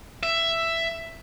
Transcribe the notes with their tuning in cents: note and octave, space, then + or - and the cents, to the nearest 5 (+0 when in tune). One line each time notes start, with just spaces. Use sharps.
E5 +10